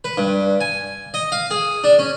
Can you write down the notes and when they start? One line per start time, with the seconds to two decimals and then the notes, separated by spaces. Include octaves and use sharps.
0.04 B4
0.18 G2
0.61 G#5
1.14 D#5
1.32 F5
1.51 G#4
1.84 D4
1.99 C#4